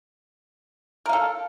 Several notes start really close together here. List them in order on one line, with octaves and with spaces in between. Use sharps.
A#4 F5 A4